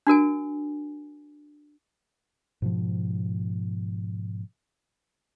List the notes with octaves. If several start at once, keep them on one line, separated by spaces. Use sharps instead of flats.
D4 F#4 A#4 G#5
G#2 B2 F3